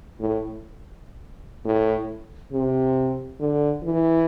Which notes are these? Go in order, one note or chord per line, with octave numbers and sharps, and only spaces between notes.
A2
A2
C3
D3
E3